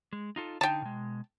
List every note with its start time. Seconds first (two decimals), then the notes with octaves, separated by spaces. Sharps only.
0.13 G#3
0.36 D#4 F4 A4
0.61 D3 D#4 G5 A5
0.82 B2 G#3